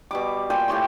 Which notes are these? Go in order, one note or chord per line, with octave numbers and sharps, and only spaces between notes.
B2 G3 D6
A#2 G5 G#5 C6
A2 G4 C#5 C6